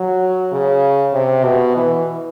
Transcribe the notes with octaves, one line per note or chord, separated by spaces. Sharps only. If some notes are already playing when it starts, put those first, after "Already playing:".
Already playing: F#3
C#3
C3
B2
E3